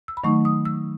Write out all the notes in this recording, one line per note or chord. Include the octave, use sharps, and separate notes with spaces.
E6
B5
D#3 F#3 A3 D#4 C#6
D#6
E6